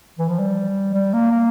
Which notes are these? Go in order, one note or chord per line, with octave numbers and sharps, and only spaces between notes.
E3
F3
G3
G3
A#3
A#3